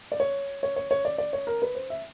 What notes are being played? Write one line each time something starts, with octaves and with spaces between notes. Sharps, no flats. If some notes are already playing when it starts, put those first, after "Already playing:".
D5
C#5
C#5
C#5
C#5
D5
D5
C#5
A#4
B4
C5
E5